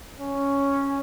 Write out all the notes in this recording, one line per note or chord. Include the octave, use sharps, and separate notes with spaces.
C#4